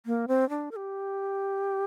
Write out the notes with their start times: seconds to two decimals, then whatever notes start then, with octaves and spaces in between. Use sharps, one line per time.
0.06 A#3
0.28 C4
0.49 D4
0.71 A#4
0.76 G4